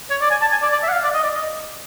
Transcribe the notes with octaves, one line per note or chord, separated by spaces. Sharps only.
C#5
D5
G#5
A5
G#5
D5
D5
E5
F#5
F5
D5
D#5
D5
D#5